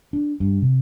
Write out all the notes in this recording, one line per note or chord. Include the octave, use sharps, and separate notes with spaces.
D4
G2
C3